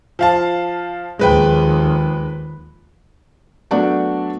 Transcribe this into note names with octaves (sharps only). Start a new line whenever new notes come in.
F3 F5 A5
D#2 F3 G#3 B4 G5
F#3 A3 B3 D4 F#4 D5